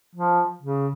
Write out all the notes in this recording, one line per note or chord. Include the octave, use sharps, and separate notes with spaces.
F3
C#3